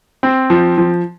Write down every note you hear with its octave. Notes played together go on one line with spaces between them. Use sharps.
C4
F3
F3